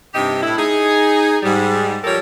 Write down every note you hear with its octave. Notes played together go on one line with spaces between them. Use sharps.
G2 C3 D#4 G4
A2 E4
D#4 G#4
G#2 G3
F3 G3 G4 A4 A#4 C#5